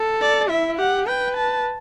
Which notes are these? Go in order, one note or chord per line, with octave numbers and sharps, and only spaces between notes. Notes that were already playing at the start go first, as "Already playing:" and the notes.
Already playing: A4
D5
E4 E5
G4 F#5
B4 G5
A5